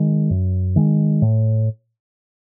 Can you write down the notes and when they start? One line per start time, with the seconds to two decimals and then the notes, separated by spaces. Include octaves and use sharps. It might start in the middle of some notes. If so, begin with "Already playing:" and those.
Already playing: D#3 G#3
0.30 F#2
0.76 D#3 G#3
1.22 A2